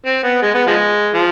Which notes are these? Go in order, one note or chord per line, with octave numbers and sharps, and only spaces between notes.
C4
B3
G#3
B3
F3 G#3
F3